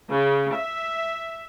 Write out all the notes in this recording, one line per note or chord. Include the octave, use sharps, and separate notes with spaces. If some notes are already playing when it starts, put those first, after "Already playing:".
C#3
E5